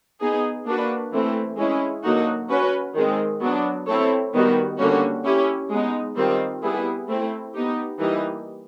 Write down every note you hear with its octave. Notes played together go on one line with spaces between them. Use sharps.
B3 D#4 G#4
A#3 D4 F#4 B4
E3 A3 C4 E4
G#3 C#4 E4
D3 F#3 A#3 D#4 F#4
C#4 F#4 B4
D#3 G#3 C4
F#3 B3 D4
A3 C4 E4 A4 C#5
D#3 G3 B3 D#4 F#4
D3 G3 A#3 C#4 F#4
C#4 E4 G4
G#3 B3 D#4
D#3 G3 C4 F4
G3 B3 E4 G#4
A3 C4 E4
B3 D#4 G4
E3 G3 A#3 D#4